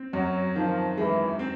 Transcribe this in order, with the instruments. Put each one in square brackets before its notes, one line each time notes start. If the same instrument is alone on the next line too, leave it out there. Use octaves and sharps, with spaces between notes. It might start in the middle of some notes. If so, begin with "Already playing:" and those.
Already playing: [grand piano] C4
[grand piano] F#2 [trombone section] F#3
[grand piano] D#3 [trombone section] F3
[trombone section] E3 [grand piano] G#3
[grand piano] C4